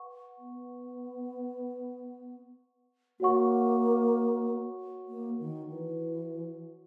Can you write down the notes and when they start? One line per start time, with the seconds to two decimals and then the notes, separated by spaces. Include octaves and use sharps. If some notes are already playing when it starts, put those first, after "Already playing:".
Already playing: B4 F#5 C#6
0.38 B3
3.20 A#3 F#4 C#5 F#5 C#6
5.08 A#3
5.40 D#3
5.70 E3